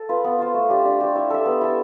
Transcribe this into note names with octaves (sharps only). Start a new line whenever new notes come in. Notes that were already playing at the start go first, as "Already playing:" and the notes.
Already playing: A4
F4 B4
B3
F4 C5
A3
D4 G4
D4
G4 C5
E4
A4 E5
B3
E4 A4